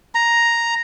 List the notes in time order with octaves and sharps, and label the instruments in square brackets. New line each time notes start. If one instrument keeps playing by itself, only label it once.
[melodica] A#5